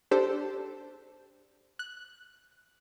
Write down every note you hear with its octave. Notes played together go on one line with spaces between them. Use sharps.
D4 G4 A4 C5
F#6